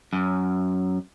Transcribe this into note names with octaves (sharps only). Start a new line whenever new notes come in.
F#2